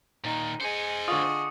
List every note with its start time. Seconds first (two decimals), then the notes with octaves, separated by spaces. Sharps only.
0.24 A#2 D#3 D#4
0.61 G#4 C5 D#5 G#5 C#7
1.08 D3 F4 C#6 D#6